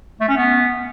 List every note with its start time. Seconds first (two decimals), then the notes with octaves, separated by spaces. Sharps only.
0.21 A3
0.29 C#4
0.37 B3